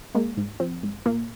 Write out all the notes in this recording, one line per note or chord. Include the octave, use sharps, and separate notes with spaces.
G#3 A#3
G#2
F3 C4
G#2
A#2 A#3